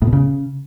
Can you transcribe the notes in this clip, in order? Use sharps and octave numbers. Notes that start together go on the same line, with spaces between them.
A2
B2
C#3